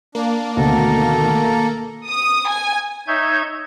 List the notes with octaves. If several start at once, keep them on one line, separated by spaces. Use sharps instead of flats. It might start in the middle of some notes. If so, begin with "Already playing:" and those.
A#3 D4
D2 B2 D#3 A3 A4 A#4 A#5
D#6
G#5
D#4 C#5 E5 G6 G#6